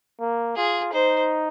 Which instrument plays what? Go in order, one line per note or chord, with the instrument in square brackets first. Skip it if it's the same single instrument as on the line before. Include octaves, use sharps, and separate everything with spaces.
[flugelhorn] A#3
[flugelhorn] F4 [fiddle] G#4
[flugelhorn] D#4 [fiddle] C5